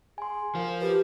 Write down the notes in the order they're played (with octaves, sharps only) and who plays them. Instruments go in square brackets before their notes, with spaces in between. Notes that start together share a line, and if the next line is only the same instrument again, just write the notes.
[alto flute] G#4 [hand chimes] G#5 C6
[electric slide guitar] F3 F4 [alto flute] A#4
[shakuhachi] G4 [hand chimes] B4